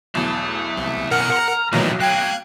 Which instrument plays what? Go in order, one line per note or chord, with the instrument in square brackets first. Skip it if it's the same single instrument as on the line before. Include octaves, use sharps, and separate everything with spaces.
[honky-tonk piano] B1 E2 [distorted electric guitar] E5 A5
[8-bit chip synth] C2
[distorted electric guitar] B2 C#4 [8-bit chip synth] A#4 F#5 C#7 [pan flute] F6
[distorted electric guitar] A#5 C6
[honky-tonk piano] B1 F#3 [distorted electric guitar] E2 G3 [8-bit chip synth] A#2 D#3 E3
[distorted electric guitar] A3 F5 [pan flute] G5 [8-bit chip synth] F#6 G#6